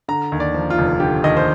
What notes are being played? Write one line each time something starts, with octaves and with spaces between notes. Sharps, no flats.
D3 A#5
D#2
D5
F3
F4
F1
D3 G4
D#2 D#5
C5